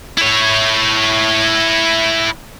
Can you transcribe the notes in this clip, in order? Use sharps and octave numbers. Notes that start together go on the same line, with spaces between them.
E4 C#5